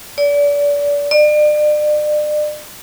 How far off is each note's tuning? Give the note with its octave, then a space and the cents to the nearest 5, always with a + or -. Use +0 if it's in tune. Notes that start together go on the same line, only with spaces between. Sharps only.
D5 -30
D5 +35